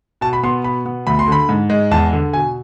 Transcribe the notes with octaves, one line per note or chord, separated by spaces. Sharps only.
B2 A5
B5
B3 C6
B2 B5
B3
D2 B5
C6
D3 B5
G#2
G#3
E2 A5
D3
B2 G#5